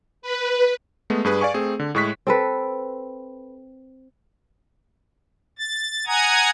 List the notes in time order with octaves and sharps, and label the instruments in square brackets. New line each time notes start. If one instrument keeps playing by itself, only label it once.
[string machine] B4
[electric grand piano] G#3 A3 B3
G2 G#4 B4
D5 F5 G#5 C#6
A3 C4 G#4
D3
A2 G#3 C#6 F#6 B6
[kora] C4 A4 B4
[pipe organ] A6
F#5 G#5 A#5 D#6 G#6